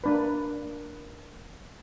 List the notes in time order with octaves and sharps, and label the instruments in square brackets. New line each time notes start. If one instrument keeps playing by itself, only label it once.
[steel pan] A#3 D4 B4